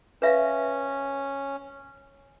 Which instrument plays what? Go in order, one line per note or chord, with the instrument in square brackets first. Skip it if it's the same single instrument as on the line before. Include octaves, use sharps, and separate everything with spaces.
[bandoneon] C#4 [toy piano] B4 E5 F5